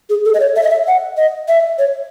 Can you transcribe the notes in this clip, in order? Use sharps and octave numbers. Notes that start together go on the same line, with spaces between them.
G#4
A4
D#5
C#5
E5
D#5
E5
F#5
D#5
E5
C#5